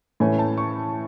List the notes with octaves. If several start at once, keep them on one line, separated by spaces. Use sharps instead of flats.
A2 E3 A3 C#4 G#5
A5
C#6